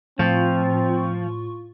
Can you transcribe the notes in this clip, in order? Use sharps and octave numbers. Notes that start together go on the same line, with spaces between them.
A2 F3 C4 F4 C#6